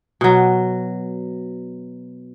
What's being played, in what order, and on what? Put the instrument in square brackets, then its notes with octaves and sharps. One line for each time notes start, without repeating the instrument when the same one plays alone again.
[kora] B2 F#3